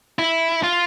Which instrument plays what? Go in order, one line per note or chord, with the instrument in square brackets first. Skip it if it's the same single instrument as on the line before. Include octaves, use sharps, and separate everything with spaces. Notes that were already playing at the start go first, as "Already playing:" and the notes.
[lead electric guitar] E4
F4